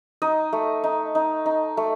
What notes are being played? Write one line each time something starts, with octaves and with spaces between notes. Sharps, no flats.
D#4 D#5
A3
D#4
D#4
D#4
A3